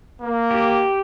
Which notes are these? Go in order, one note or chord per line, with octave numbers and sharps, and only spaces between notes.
A#3
G4